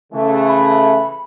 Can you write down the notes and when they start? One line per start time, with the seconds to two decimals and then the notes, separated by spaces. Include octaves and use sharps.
0.13 C#3 E3 A3
0.49 B5